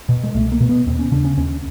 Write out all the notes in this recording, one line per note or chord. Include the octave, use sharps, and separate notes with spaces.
B2
G#3
C2 A3
A#3
B2
B3
D#2 C4
C#4
C#3 D4
C#4
D#2 C#4